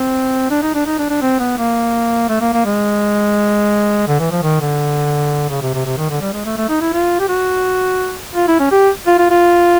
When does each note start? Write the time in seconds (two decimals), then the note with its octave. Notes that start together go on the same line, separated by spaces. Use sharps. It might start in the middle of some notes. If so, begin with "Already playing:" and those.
Already playing: C4
0.51 D4
0.63 D#4
0.75 D4
0.86 D#4
0.99 D4
1.10 D4
1.22 C4
1.40 B3
1.58 A#3
2.29 A3
2.41 A#3
2.54 A#3
2.65 G#3
4.08 D3
4.19 E3
4.31 F3
4.43 D#3
4.61 D3
5.50 C#3
5.62 C3
5.74 C3
5.86 C3
5.98 D#3
6.10 D3
6.22 G3
6.33 G#3
6.46 A3
6.58 A3
6.69 D#4
6.81 E4
6.93 F4
7.19 G4
7.29 F#4
8.35 F4
8.48 E4
8.59 C#4
8.71 G4
9.07 F4
9.19 F4
9.31 F4